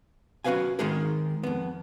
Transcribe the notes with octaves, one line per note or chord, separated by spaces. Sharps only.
C#4 F#4 G4 B4 F5 G#5
D#3 G#3 D#4 G#4 A#4
F2 B3